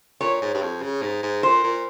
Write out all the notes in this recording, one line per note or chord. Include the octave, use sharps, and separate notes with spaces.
A#2 C#5
G#2
G2
F2
C#3
G#2
G#2
A#2 C5
A#2